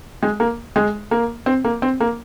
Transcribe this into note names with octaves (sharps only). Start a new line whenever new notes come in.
G#3
A#3
G#3
A#3
C4
A#3
C4
A#3